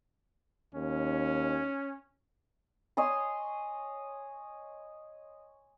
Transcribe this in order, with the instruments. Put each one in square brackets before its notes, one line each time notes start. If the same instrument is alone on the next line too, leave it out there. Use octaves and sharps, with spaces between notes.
[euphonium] D#2 [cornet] C#4
[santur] C#5 D#5 G#5 C6